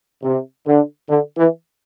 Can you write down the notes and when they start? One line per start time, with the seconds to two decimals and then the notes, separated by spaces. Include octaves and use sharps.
0.23 C3
0.67 D3
1.10 D3
1.38 E3